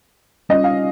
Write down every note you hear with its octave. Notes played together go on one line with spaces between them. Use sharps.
G3 C#4 F4 D#5
F5